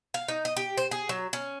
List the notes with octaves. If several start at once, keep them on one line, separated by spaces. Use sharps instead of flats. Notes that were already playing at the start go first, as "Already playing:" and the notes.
F5
D#4
D#5
G4
C5
G#4
F#3
C#4